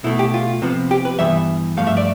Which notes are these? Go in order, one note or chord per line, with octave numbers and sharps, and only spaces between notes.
B2 A3 E4
G4
F4
C3 F3 B3
G4
B4
G2 E3 G3 B3 E5
G2 F3 A3 F5
E5
D5